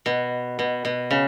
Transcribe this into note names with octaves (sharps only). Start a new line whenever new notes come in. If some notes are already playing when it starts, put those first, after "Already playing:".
B2
B2
B2
C#3